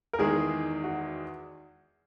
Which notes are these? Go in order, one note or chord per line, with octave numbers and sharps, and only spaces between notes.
A#4
E2 D#3 G#3 G#4
F#4